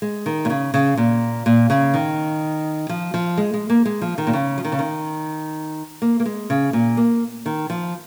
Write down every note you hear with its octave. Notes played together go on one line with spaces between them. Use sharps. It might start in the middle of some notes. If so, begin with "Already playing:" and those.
G#3
D#3
A#2
C#3
C#3
A#2
A#2
C#3
D#3
F3
F3
G#3
G#3
A#3
G#3
F3
D#3
A#2
C#3
F3
D#3
C#3
D#3
A#3
A#3
G#3
C#3
A#2
A#3
D#3
F3